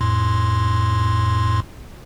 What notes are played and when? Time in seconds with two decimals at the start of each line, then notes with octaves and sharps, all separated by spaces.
0.01 F2 A2 C6